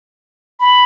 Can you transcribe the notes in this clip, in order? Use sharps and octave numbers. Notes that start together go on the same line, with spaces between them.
B5